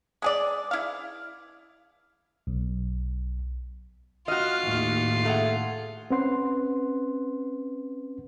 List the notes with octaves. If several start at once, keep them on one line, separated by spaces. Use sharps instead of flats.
G#3 G#4 D5
E4 F5
B1
F4 F#4 D#5 F6
D#2 A2
A3 G#4 F#5
C4 C#4 B4 F#5 C6